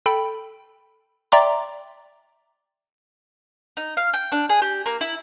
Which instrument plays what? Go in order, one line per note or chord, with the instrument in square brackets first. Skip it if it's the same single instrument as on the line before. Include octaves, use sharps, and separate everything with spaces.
[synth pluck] A4 G5 B5
D5 E5 G5 A#5 C6 D6
[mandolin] D#4
F5
G5
D4
G#4
G4
A#3
E4